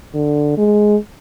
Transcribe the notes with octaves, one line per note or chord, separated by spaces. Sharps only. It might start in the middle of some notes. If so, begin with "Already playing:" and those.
D3
G#3